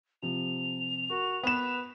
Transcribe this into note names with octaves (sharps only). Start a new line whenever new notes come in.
C3 F3 F7
F#4 A#4
B3 B4 E7